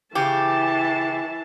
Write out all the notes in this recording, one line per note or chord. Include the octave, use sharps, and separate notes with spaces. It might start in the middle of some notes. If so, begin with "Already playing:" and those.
C#3 E3 G4 A5